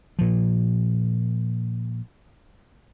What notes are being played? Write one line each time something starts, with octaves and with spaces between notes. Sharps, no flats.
A#2 F3